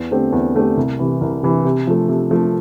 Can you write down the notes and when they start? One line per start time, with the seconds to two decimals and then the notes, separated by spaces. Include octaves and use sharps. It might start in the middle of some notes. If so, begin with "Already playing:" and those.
Already playing: E2
0.11 D3 A3 C4 G4
0.32 E2
0.54 D3 A3 C4 G4
0.77 C2
0.99 C3 E3
1.21 C2
1.43 C3 E3
1.65 C3
1.87 F3 A3
2.09 C3
2.31 F3 A3